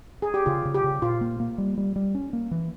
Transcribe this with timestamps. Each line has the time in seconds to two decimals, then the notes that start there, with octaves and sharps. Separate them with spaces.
0.22 G#4
0.34 G4
0.46 C#3 F4
0.65 C#3
0.74 G4
0.84 C#3
1.02 A#2 F4
1.21 A#3
1.40 A#3
1.58 G3
1.78 G3
1.96 G3
2.15 C#4
2.33 A#3
2.51 E3